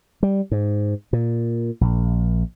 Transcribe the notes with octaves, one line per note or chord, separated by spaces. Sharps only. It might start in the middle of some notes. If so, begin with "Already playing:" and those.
G3
G#2
A#2
A#1